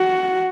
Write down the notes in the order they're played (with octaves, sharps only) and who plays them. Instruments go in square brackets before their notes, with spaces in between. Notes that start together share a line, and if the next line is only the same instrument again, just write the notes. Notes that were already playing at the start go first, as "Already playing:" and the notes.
Already playing: [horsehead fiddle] F#4